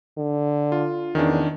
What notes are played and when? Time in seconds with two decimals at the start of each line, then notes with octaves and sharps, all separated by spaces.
0.17 D3
0.72 F4
1.15 E2 D#3 C#4 D4